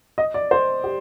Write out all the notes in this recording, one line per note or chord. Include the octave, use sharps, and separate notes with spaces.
D#5
D5
C5
G4